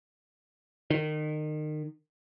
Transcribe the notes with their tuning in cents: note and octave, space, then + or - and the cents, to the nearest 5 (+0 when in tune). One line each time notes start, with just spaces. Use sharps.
D#3 -30